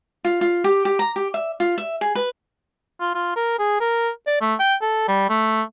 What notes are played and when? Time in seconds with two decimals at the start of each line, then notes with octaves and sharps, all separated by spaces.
0.25 F4
0.41 F4
0.64 G4
0.85 G4
0.99 A#5
1.16 G4
1.34 E5
1.60 F4
1.78 E5
2.01 G#4
2.15 B4
3.00 F4
3.15 F4
3.36 A#4
3.59 G#4
3.81 A#4
4.27 D5
4.41 A3
4.60 G5
4.82 A4
5.08 G3
5.30 A3